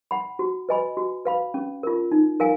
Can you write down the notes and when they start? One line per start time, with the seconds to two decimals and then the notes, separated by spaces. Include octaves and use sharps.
0.11 F#5 B5
0.39 F#4
0.69 B4 D#5 G#5 B5
0.97 F#4
1.25 B4 F5 B5
1.54 C#4
1.83 F4 A#4
2.12 D#4
2.40 A#4 F5 G#5